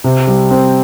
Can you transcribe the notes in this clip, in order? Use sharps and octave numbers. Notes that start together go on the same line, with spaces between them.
C3
G3
C4